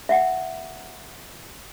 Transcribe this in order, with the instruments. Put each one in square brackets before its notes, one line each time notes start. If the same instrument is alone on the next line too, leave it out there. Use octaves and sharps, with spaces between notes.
[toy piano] E5 F#5